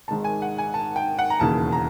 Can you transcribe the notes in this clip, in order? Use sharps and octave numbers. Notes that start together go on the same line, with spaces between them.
G#1 G#2 D#3 G#3 A5
G#5
F#5
G#5
A5
G5
F#5
A#5
E1 D#2 C#3 E3 A5
A#5